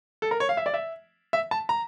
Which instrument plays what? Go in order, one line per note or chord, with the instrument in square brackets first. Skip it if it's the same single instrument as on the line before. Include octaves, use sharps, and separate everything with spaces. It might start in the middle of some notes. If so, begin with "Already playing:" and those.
[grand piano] A4
A#4
C#5
F5
E5
D5
E5
E5
A5
A#5